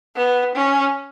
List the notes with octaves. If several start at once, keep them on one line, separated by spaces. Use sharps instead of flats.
B3
C#4